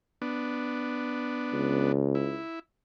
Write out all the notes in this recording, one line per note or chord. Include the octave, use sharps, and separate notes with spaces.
B3 D4
C#2
E4